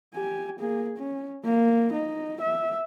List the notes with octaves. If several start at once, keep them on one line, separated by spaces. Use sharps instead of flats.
G4 G#5
A#3 G#4
C#4
A#3
D#4
E5